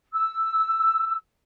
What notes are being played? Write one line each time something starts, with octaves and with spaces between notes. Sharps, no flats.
E6